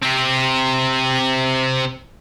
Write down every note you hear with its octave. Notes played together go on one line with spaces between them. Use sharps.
C3 C4